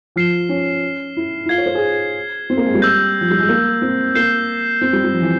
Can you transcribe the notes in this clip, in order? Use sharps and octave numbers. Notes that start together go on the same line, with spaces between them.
F3 F6 C7 E7 G7
C#4
E4
E4
F4 G#6 C7 G7
C#5
C5
G#4
C4
A#3
G#3
G3
E6 G6 A#6
F3
G3
G#3
A#3
C4
A#3 G6 C7 E7 G7
C4
G3
G3
F3
E3